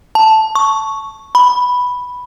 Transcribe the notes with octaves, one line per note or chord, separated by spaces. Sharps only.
A5
C#6
B5